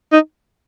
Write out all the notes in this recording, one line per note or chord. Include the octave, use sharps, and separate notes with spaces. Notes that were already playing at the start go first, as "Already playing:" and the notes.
D#4